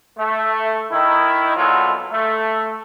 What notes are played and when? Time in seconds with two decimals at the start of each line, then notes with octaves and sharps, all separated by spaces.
0.18 A3
0.91 D#3 E4
1.56 C2 B2 F#3 G#3 F4 A4
2.12 A3